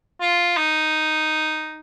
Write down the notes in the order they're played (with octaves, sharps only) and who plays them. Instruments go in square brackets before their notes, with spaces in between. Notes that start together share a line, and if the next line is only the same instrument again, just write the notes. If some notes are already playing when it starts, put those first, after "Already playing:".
[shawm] F4
D#4